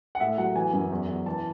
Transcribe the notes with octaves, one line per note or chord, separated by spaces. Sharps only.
F#5
A2 E5
F#3 F#5
E3 G#5
F#2
E2
E2
E3 A5